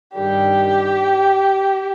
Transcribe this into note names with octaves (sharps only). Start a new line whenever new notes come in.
G2 D#3 G3 G4